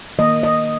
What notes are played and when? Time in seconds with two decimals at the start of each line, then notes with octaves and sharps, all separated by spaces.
0.18 D#3 A#3 D#5
0.43 D#5